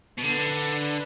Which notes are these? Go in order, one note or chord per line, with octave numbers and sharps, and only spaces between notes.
B2
D3 B4